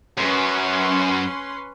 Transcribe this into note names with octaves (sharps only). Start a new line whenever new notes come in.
F#2 C#4 B4 C6